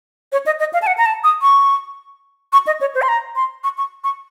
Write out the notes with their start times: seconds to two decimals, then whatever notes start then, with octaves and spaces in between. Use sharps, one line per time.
0.32 C#5
0.46 D#5
0.59 D#5
0.73 F5
0.82 A5
0.87 F#5
0.98 A#5
1.06 A5
1.24 D#6
1.42 C#6
2.53 C#6
2.67 D#5
2.81 C#5
2.95 C5
3.02 C6
3.08 A#5
3.36 C6
3.64 C#6
3.78 C#6
4.04 C#6